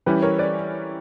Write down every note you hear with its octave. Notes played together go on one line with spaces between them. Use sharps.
E3 G3 C#4 E4 G4 B4
A#4 C#5
B4 D5